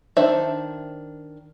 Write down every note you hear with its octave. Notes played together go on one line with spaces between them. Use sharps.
D#3 D4 C5 E5 A5